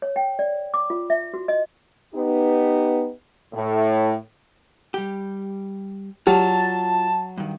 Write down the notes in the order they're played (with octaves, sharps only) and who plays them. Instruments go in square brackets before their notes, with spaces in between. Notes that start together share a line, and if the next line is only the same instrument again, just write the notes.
[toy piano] C#5
G5
D5
D6
F4
E5
F#4
D#5
[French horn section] B3 D#4 G4
A2
[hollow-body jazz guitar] G3 G4
[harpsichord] F#3 [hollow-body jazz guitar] F4 D5 [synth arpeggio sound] G4 [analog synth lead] A5
[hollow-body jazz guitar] G2 D#3